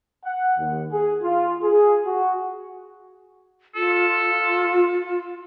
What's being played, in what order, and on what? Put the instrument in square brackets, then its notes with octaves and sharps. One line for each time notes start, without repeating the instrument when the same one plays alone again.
[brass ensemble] F#5
D#2
G#4
F4
G#4
F#4
[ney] F4 [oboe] A4